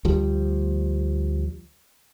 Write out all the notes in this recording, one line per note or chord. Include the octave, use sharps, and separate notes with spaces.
D2 F3 G3